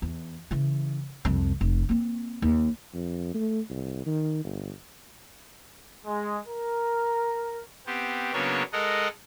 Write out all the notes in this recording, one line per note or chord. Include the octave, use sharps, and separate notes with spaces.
E2
C#3 E3
C2 F2
F1
A#3 C4
D#2
F2
A3
C2
D#3
G1
G#3
A#4
B3 C4 G4
C#3 F#3 A#3 B3 D4 C#5
G#3 A4 A#4 D#5 F#5